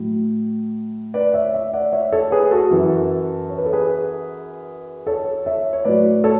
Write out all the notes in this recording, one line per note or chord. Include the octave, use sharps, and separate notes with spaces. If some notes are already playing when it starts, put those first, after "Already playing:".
Already playing: A2 F#3
B4 D5
C#5 E5
C#5 E5
D5 F#5
C#5 E5
A4 C#5
G#4 B4
F#4 A4
F#2 E3
C#5
B4
A4
G#4 B4
A4 C#5
C#5 E5
C#5
A2 F#3 B4 D5
A4 C#5